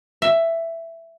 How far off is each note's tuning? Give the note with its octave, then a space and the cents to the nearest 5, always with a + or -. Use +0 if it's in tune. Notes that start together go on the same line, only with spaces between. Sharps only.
E5 +10